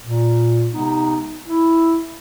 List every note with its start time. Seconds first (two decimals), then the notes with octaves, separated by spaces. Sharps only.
0.04 A#2
0.73 C3 G#3 B3 D#4
1.47 E4